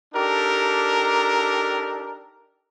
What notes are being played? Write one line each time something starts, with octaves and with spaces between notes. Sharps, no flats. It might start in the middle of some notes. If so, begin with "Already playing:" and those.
D4 D#4 G4 A4 A#4